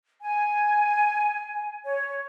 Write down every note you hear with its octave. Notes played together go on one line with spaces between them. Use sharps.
G#5
C#5